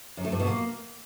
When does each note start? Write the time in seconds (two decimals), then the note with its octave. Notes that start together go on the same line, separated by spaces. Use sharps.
0.17 F#2
0.25 A3
0.32 G2
0.40 B2
0.47 A#3